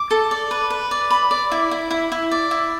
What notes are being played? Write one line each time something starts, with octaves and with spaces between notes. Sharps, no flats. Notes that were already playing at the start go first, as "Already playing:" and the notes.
Already playing: D6
A4
D5
B4
B4
D5
B5
D5
E4
E4
E4
E4
D5
E4